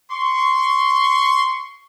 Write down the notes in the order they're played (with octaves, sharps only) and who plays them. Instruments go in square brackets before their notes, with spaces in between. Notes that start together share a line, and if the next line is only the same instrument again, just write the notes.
[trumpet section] C6 C#6